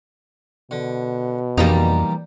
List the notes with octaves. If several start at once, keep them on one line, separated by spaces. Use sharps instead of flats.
B2 D3
F2 E3 F3 G3 A#3 D#4 G4